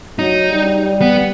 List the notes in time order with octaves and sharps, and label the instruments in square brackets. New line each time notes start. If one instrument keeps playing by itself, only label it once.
[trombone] F#3 [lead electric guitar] D#4
[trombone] G3
G3
[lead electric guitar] B3